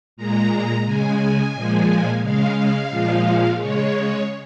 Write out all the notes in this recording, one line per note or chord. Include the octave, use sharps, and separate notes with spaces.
A#2 G#3 A#5
C#3 G#3 G#5
A#2 F3 G#3
C#3 G#3 F5
A#2 F3 G#3
C#3 G#3 C#5